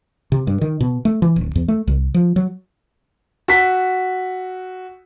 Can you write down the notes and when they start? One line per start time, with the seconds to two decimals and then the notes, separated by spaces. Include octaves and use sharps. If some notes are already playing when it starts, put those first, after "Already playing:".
0.32 C3
0.47 G2
0.61 D#3
0.80 B2
1.05 A3
1.22 E3
1.36 D1
1.55 E2
1.68 A3
1.87 C2
2.14 F3
2.36 F#3
3.48 F#4 B6